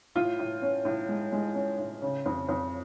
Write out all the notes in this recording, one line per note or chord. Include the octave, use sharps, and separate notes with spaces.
A2 F4
A2
C#4
A2
G#3
G#3
C#4
A2
C#3
F2
F2